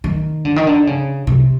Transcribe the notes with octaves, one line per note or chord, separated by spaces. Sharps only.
D#3
D3
D#3
D3
C#3
C3